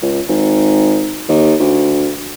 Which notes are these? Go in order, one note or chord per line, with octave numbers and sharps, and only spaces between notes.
C#2
G#1
D#2
D2